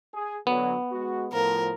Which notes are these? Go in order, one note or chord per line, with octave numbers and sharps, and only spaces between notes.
G#4
D3 F#3 B3
G#3 F#4
A2 F3 A#4